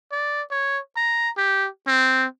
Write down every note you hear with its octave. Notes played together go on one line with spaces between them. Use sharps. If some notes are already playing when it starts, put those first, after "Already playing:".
D5
C#5
A#5
G4
C4